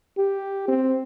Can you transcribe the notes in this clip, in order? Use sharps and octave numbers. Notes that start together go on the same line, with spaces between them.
G4
C4